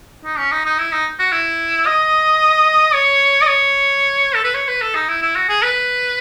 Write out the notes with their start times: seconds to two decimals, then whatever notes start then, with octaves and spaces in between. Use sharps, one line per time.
0.25 D#4
0.38 C#4
0.52 D#4
0.65 D#4
0.78 E4
0.92 D#4
1.19 F#4
1.32 E4
1.86 D#5
2.93 C#5
3.41 D#5
3.47 C#5
4.35 A4
4.44 B4
4.54 C#5
4.68 B4
4.81 A4
4.95 D#4
5.09 E4
5.22 E4
5.36 F#4
5.49 G#4
5.62 B4